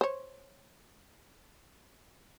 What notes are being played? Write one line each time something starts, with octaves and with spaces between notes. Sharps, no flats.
C5 C#5